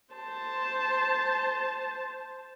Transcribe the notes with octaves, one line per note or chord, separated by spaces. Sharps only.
C5 A5